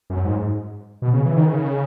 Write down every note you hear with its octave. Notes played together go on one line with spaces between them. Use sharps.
F#2
G#2
B2
C#3
E3
D#3
C#3